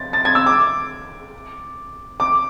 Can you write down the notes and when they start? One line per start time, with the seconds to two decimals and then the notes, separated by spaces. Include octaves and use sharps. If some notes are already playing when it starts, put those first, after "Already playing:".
Already playing: A6
0.13 A6
0.25 G#6
0.35 E6
0.46 D6
2.20 D6